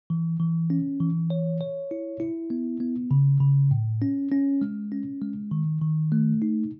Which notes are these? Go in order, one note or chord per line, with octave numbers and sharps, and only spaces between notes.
E3
E3
C#4
E3
C#5
C#5
E4
E4
B3
B3
C#3
C#3
A2
C#4
C#4
G#3
C#4
G#3
D#3
D#3
A3
D#4